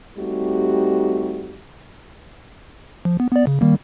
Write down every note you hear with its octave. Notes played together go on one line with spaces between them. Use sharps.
G3 A3 C4 D#4 F#4 G4
F3
B3
B3 D5
C#3
D#3 G3 A#3